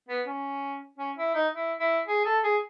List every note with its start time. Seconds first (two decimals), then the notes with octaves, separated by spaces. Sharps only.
0.09 B3
0.26 C#4
0.98 C#4
1.17 E4
1.34 D#4
1.54 E4
1.80 E4
2.07 G#4
2.25 A4
2.44 G#4